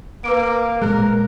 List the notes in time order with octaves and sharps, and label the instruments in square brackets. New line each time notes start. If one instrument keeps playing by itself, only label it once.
[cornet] A#3 [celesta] B4 D6 D7
[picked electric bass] A#2 G#3 [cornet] A#4 [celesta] F#6